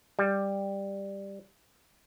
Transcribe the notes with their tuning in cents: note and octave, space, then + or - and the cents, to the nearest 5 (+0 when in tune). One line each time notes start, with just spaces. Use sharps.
G3 +10